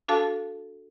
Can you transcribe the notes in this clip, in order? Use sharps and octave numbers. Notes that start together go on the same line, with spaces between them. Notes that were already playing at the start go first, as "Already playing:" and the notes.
D4 F#4 A4 F5 A5